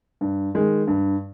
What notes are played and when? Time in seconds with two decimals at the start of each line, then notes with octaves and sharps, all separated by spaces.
0.21 G2
0.55 D#3 G#3
0.87 G2